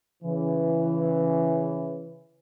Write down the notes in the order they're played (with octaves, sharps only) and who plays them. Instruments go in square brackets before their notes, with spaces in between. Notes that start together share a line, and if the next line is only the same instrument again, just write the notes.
[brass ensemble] C#3 E3